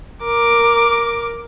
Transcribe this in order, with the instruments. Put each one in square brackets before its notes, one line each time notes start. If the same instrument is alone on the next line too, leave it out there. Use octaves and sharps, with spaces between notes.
[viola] A#4 D6